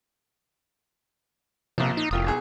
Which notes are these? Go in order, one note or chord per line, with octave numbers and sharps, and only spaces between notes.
A#1 C3 F3
D#4
F1 C2 F4 D#6
B1 G#4